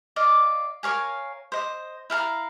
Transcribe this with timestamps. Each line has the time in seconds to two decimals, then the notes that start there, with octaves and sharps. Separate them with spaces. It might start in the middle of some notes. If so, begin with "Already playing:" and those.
0.16 D5 D#5 F5
0.83 A#4 C#5 F5 G#5
1.52 C5 D#5
2.10 E4 F5 A5 A#5